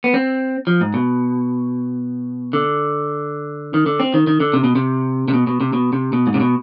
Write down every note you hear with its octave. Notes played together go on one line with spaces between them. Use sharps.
B3
C4
F3
G#2
B2
D3
D#3
D3
C4
D#3
D#3
D3
C3
B2
C3
C3
B2
B2
C3
B2
C3
B2
G#2
C3
B2